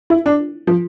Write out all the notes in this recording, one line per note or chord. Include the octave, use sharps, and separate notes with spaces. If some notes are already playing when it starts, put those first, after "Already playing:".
E4
D4
F3